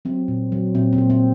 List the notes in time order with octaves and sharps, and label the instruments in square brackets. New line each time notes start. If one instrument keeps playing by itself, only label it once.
[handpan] F#3 C4
A#2
F#3
A#2 C4
C4
A#2
C4